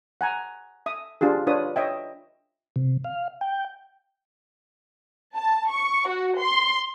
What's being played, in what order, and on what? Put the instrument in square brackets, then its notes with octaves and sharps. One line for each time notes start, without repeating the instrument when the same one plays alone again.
[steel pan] F#5 G#5 A#5
E5 D#6
D4 F4 G4 G#4
D4 F4 B4 C#5 D#6
C#5 D#5 E5 G5
[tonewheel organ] C3
F5
G5
[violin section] A5
C#6
F#4
C6